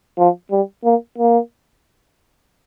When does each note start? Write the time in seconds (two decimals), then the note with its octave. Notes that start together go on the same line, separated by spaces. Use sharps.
0.19 F3
0.51 G3
0.84 A#3
1.18 A#3